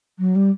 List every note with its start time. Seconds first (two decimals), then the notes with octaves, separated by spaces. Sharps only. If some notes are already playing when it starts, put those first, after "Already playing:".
0.18 F#3
0.35 G3